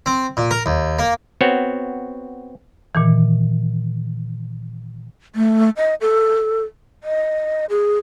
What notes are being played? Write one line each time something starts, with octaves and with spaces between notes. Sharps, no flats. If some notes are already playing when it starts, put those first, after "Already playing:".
C4
A#2
A#4
D#2
A#3
B3 C4 F#4 C#5
A#2 D#3 E3
A3
D#5
A4
D#5
G#4